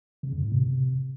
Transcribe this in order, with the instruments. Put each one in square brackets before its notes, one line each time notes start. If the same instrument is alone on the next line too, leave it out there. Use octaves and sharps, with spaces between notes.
[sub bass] C#3
F#2
A2
C3